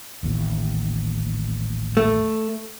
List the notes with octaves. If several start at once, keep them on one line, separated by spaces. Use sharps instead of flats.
D#1 A1 D#2
A3